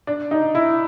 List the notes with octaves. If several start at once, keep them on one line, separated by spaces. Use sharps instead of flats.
D4
D#4
E4